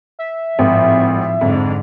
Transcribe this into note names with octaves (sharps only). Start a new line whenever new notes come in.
E5
G#1 A2 F3
F2 G#2 D3